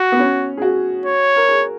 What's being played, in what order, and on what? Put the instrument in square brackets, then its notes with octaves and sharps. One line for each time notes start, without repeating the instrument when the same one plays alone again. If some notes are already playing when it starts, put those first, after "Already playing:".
Already playing: [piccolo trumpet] F#4
[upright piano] B3
C#4
G#4
F#4
[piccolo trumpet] C#5
[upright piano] A#4
G#4